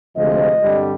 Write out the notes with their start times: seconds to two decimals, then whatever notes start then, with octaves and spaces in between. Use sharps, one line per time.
0.16 D2 C3 F3 G#3 D#5
0.61 G2 D3 G3 C4